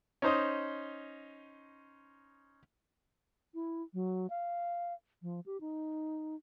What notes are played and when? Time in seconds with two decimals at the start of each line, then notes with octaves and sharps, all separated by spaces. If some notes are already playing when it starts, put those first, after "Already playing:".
0.22 C#4 D#4 C5 D#5
3.54 E4
3.94 F#3
4.30 F5
5.22 F3
5.46 G4
5.61 D#4